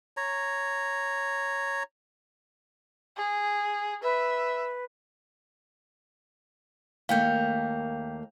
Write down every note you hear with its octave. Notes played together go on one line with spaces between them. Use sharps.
C#5 A#5
G#4
B4 E5
D#2 A3 A#3 F5 G5 G6